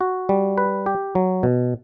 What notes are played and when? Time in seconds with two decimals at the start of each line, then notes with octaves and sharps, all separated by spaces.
0.01 F#4
0.29 G3
0.58 B4
0.86 G4
1.15 F#3
1.43 B2